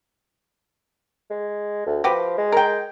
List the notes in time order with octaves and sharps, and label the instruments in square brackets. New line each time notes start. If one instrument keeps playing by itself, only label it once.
[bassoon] G#3
D2
[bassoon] F3 [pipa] F#4 G4 B4
[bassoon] G#3
[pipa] A#4 G5